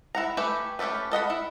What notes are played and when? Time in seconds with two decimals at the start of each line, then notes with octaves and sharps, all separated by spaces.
0.15 E4 F#5 A#5
0.37 A3 G4 B4 E5 G#5
0.79 A3 C#4 G4 A4 B4
1.11 A4 D#5 F#5 B5
1.30 E4